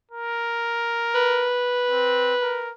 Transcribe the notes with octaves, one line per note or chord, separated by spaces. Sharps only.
A#4
B4
C4
A#4